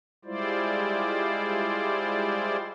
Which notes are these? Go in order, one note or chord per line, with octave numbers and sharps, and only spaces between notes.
G3 G#3 E4 F4 C5 D5